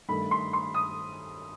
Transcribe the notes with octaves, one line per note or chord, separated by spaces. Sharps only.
G2 D#3 A3 B5
C6
C6
D#6